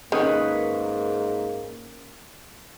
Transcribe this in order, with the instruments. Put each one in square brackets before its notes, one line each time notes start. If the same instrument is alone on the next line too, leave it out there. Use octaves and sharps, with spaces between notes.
[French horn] G#2 [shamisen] D#3 [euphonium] A#3 [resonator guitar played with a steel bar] C#4 G#4 B4